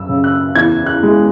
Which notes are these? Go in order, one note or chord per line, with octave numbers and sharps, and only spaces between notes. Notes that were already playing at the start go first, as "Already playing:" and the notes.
Already playing: F#2 E6
C#3
F#6
E2 G#6
F#6
G#3